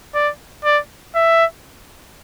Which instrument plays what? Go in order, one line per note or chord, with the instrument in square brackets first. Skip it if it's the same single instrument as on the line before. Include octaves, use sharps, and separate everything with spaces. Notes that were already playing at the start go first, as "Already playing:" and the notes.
[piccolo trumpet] D5
D5
E5